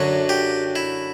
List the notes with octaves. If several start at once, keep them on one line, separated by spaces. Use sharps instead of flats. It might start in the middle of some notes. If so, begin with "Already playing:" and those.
Already playing: F#2 D3 F#3
G4
E4